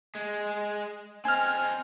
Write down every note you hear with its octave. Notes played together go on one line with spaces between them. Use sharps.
G#3
C4 C5 D#5 G#5 F6